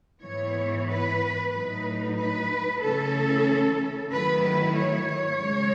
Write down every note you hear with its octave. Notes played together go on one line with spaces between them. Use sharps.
G#2 E3 B3 C#5
B4
A2 F#3 A3 D#4 B4
B4
C#3 E3 A3 C#4 A4
D#3 F#3 A3 E4 B4
B4
C#5
C#3 G#3 C#4